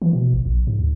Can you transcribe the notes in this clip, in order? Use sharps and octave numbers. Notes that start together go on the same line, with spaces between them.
E3
B2
G#1
A#1
G#2
D2